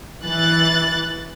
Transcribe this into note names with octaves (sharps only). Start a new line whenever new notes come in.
E3 F#6 A6